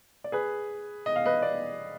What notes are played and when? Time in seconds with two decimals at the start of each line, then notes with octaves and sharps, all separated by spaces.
0.24 D5
0.32 G#4 B4
1.06 D#5
1.16 F5
1.26 B4 D#5
1.42 D5